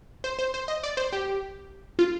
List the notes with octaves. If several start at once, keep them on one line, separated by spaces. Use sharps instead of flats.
C5
C5
C5
D#5
D5
C5
G4
F4